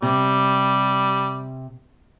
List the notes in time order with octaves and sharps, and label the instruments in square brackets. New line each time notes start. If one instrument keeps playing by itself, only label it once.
[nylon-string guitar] C3 [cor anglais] G3